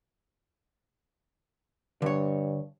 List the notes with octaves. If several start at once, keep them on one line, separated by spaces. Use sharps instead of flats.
G2 D3 C#5